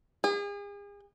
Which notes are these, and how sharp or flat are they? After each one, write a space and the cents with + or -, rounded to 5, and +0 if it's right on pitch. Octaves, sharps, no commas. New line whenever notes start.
G#4 -40